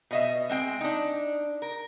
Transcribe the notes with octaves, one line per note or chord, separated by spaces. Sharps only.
B2 D#5 E5
G#3 C4 G5
D4 D#4
A#4